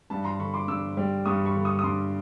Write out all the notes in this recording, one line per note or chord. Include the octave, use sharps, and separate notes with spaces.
G2 A5 B5
A#5 C6
D3 B5 C#6
C6 D6
G2 D6 E6
G3
G2 C#6 D#6
B5 C#6
D3
C#6 D#6
D#6
G2 C6 D6